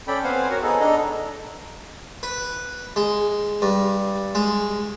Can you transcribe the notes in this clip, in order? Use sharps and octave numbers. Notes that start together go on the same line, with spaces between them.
C#4 A4 D5 G5 B5
B3 C4 C5 F5 F#5 G#5
F#4 A#4 C#5 F#5
B3 D#4 G#4 A4
D4 D#4 A4 D#5
B4
G#3
G2
G#3